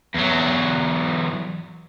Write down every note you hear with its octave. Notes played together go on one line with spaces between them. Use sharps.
E2 F#3